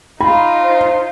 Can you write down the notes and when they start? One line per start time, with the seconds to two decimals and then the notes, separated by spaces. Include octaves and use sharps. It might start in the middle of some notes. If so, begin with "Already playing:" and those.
0.21 D#4 F4 B5
0.62 C5